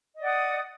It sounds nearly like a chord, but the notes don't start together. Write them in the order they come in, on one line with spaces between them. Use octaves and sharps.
D#5 D5 F#5 D#6